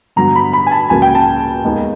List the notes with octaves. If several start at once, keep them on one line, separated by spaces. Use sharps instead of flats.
G2 D3 F#3 B3 A#5
B5
B5
G#5
A5
C#2 C#3 F#3 A#3 G#5
G5
A5
D#2 D#3 G#3 B3